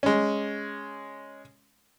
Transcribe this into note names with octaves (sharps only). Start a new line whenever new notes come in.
G#3 C#4